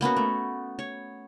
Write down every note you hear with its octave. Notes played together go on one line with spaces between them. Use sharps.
A#3 B3 C#4 F#4
A3
C#5